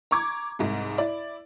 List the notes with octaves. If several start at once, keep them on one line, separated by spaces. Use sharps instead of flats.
A#5 C#6 D6 G#6
C2 G#2
E4 D5